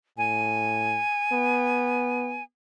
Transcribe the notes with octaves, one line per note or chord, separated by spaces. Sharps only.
A2 G#5
B3